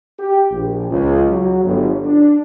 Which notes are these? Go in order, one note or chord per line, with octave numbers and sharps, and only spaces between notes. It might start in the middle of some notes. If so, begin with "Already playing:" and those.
G4
A#1
C#2
F#3
G1
D4